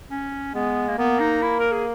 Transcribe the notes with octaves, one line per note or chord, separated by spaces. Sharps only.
C#4
G#3 B3
A#3
A#3 B3
D#4
E4
A#4
G#4